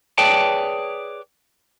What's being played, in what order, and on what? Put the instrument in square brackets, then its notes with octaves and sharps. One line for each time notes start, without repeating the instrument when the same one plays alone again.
[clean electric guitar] G#4 B4 C#5 D5 G5 A5